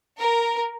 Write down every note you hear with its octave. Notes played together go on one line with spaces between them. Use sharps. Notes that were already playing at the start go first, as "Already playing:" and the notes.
A#4